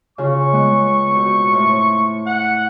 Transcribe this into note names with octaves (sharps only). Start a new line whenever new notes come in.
C#3 F4 C#6
G#3 B3
B2 C4
A2 C6
F#5